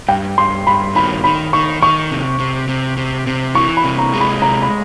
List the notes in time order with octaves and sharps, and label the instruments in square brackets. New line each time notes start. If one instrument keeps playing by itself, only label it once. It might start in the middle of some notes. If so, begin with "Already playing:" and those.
[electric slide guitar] G2 [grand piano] G5
[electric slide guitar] G2 [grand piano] C6
[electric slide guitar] G2 [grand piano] B5
[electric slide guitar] D#3 [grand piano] B5
[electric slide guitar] D#3 [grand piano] B5
[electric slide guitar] D#3 [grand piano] C#6
[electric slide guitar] D#3 [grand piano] C#6
[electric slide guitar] C3
C3
C3
C3
C3
[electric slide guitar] E3 [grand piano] C#6
[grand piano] B5
[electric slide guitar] C3
[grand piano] A#5
[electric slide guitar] G#3
[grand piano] B5
[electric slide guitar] C3 [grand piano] A#5
[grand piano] B5